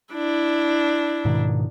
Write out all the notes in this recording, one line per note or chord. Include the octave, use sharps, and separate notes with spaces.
D4 E4
G#2 B2 D#3